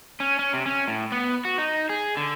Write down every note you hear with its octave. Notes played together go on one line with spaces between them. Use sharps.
C#4
C#4
C3
C#4
A2
B3
F#4
D#4
G#4
D3